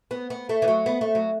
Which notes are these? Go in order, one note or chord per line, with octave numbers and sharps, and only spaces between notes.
B3
B3
A3
E3
F#3
B3
A3
F#3